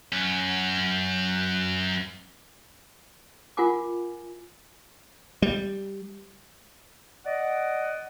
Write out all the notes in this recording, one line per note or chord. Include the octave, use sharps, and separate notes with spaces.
F#2 C#4
F4 A#4 F#5 G#5 D6
G3
D5 D#5 F#5